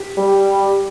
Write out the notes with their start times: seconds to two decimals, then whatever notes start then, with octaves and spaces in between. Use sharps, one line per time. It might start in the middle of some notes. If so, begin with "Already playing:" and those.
Already playing: G4
0.17 G3